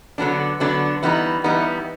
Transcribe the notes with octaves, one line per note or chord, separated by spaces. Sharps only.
D3 F#3 B3 D4
D3 F#3 B3 D4
E3 G3 B3 D#4
E3 G3 B3 D#4